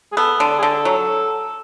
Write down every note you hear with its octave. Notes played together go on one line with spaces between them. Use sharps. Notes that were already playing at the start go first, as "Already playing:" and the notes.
G#4
B3 A4
D3 A4
G#4
D3 A4
F#3